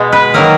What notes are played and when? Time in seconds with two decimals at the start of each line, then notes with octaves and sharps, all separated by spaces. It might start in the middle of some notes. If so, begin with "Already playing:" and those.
Already playing: B2 G#3
0.12 B4
0.34 D#3 F#3 A#3 A#4